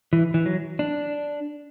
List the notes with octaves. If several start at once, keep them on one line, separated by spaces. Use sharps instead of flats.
E3
E3
F#3
D4